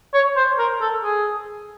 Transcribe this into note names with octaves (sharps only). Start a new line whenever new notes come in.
C#5
C5
A#4
A4
G#4